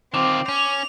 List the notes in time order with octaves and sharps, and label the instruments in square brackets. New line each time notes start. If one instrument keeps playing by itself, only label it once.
[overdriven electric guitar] D#3 F4 [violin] C4 [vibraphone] D6
[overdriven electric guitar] C#4 [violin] F7